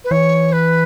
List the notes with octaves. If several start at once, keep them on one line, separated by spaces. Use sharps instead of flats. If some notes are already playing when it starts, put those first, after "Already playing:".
B4
E3 C#5
B4